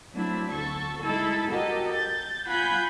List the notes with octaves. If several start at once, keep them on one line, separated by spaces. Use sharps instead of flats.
F#3 A3 C4 D4 E4
D2 A4 C#6
G#3 D#4 E4 A4
F#4 G4 A4 A#4 D#5
G6 A6
F4 F#5 G#5 B5 G6 G#6